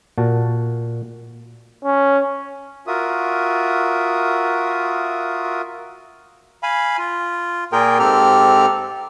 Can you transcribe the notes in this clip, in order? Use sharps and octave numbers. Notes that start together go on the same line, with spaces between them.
A#2 F#4 A5
C#4
F4 F#4 A#4 E5 D#6
F5 G#5 B5
F4
A#2 A#3 F4 G#4 A#4 G5
G#2 C4 G4 A4 F6